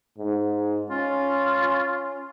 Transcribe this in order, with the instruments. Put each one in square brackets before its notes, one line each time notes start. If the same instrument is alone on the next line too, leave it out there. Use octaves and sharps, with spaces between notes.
[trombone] G#2
[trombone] C#4 [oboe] F4